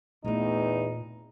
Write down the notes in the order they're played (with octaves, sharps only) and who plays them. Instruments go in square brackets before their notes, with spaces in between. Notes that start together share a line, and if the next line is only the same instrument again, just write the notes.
[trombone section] E2 [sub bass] A#2 [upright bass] A3 C4 [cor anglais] D#4